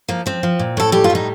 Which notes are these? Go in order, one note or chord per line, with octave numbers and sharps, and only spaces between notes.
F3 A#3
F3 C4
F3
A#2
A2 A4
G3 G4
F4
A2
D#4